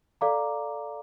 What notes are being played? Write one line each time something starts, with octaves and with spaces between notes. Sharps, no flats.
A4 D5 F5 A#5 D6